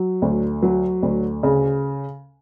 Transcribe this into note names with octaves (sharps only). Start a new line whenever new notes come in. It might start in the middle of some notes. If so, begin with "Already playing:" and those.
Already playing: F#3
D2
F#3
D2
C#3